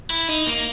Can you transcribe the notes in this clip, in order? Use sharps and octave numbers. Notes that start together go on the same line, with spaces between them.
E4
D#4
A#3